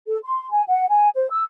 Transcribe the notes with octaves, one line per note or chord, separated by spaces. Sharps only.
A4
C6
G#5
F#5
G#5
C5
E6